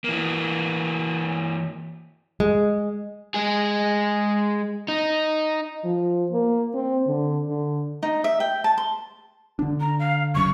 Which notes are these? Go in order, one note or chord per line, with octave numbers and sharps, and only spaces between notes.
E3 A#3
G#3
G#3 G#4
D#4
F3
A#3
C4
D3
D3
D#4
E5
G5
A5
C6
D3 D4
A#5
F5
F#1 F#2 C#6